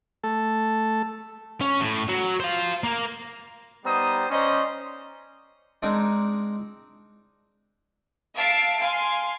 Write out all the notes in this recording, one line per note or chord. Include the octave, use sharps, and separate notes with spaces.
A3 A4
C#4
A2
F#3
C5 F5
A#3
G3 B3 D#4 C5 A#5 D#6
C#4 C5 D5 D#5 A#5 C6
G#3 C4 D4 D#4 A#4
E5 F5 A5 C7 D7
F5 G#5 C6